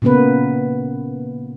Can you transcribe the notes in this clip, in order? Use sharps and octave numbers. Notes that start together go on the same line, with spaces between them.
A#2 C#3 A#3 B3 B4